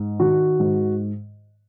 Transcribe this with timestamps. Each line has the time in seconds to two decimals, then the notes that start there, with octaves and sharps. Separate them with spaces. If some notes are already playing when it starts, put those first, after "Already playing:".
Already playing: G#2
0.20 D#3 F#4
0.59 G#2